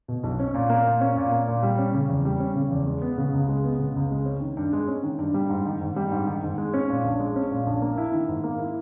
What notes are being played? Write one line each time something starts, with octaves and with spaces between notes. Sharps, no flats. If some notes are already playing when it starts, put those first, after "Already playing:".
B2
B1
C#4
A#2
A#3
A#2
C#4
A#2
A#3
A#2
G3
C#4
C#3
E2
G3
C#4
C#3
E2
G#3
B3
C#3
C#2
G#3
B3
C#3
C#2
G#3
C#4
D#3
G2
G#3
C#4
D#3
G2
G3
G#2
D#3
G#2
G3
G#2
D#3
G#2
G#3
C#4
A#2
A#1
G#3
C#4
A#2
A#1
A#3
E4
D#3
G#2
A#3
E4